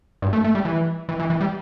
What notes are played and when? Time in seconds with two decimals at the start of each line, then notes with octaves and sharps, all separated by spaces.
0.22 G2
0.33 A3
0.44 A3
0.55 G3
0.65 E3
1.09 E3
1.19 E3
1.30 E3
1.41 G3